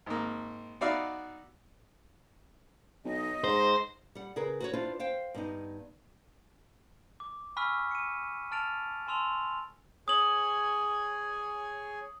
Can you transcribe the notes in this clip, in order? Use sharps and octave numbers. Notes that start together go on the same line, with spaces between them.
G#1 A#3
B3 D#4 F#4 D5 E5 F5
B1 D#5
G#2 C5
G3 F#5
C#3 G#4 A#4 B4
F#4 B4 C#5
D4 E4 F4 B4 C5
C5 F5 G5
G2 B3 D#4
D6
G#5 B5 C#6 E6 F6 B6
C#7 D#7
A5 F6 A6 D7 F7
G#5 A5 C6 E6 F7
G#4 C#5 G#5 D#6 F#7